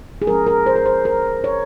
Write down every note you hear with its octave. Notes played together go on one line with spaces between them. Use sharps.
G#4
F3 G#3 C#4 A#4
A#4
C5
A#4
C5
A#4
C#5